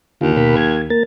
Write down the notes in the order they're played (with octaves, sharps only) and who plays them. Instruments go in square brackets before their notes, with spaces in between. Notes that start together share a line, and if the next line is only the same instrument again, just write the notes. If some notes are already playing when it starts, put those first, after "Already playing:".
[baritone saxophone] D#2 [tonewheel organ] D3 F4
[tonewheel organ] B2 A#4 B5
G#6
A#3 A#4 A6